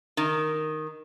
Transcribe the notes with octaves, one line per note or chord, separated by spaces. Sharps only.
D#3